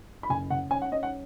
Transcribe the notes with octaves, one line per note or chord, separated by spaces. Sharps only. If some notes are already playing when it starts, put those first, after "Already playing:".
B5
F#1 G#5
C#3 F#5
C#4 G#5
F#5
C#4 D#5
F#5